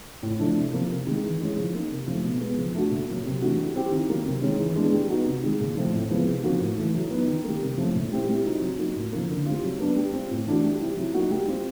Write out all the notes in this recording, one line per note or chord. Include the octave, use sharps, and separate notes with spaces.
A2
F3 A3 D4
C3
F3 A#3
C3
D#3 G#3
E3
G#3 C#4
F3
A#3 D#4
C3
F3 A3
B2
G#3 B3
F3
A3 D4 F#4
A#2
F#3 A#3
C3
E3 A3 D4 F#4
G3
C4 E4 G4
D#3
F#3 A#3
C3
D#3 G#3 C#4
E3
G#3 B3 D4
G3
B3 D#4 F#4
C3
D#3 G#3
A#2
F3 A3 C4
A2
F3 G#3 B3
C3
F3 A#3 D#4 F#4
A2
E3 A3
F#3
B3 D#4
D#3
G3 A#3
C3
F3 A3 C#4
A#2
G3 C4 E4 G4
G3
C4 D#4 F#4
F#3
A#3 D#4 F#4
A2
F3 A#3
D3
G3 C4 F4
F#3
B3 D4
G3
C4 F4
A2
E3 A3 D4 F#4
G3
C4 E4 G4
F#3
A#3 D#4 F#4
G3
C4 F4